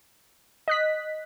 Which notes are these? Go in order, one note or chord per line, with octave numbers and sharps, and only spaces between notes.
D#5 F#6 B6